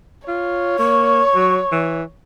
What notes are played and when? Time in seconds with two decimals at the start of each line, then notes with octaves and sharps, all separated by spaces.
0.28 F4 C#5
0.79 A#3 C#6
1.35 F#3
1.72 E3